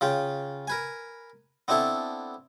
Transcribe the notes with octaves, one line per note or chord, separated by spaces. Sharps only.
C#3 F4 G5
A#4 B4 G#5
B3 C4 D4 E4 A4